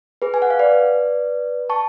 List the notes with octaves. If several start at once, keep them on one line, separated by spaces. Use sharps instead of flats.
G#4 B4
G#5
F#5
F5
B4 D5
A5 C#6